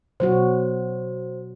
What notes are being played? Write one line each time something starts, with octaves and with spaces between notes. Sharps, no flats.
B2 F#3 F#4 C5